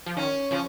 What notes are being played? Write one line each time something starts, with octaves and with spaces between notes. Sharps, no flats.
F3
D#3 C#4
C#3 F3 C#4